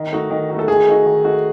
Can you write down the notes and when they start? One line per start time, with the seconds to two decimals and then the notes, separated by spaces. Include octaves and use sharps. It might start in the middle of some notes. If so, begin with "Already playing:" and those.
Already playing: D#3
0.12 A3 D#4 F#4
0.30 D#3
0.49 A3 D#4 F#4
0.59 A4
0.68 D#3 G#4
0.86 A3 D#4 F#4
1.06 D#3
1.24 A3 D#4 F#4